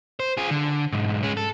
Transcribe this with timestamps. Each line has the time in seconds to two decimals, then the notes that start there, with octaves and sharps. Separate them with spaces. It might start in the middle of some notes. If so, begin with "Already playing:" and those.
0.20 C5
0.37 F4 G#4
0.51 D3
0.93 B1 G#2
1.23 G#3 C#4
1.37 A4